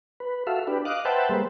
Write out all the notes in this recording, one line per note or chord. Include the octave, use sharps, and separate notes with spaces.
B4
F#4 A4 E5 F5
D4 G4 B4
D#5 F5 D6 F#6
B4 C5 E5 F#5 G5 A5
G3 G#3 A#3 B4 C5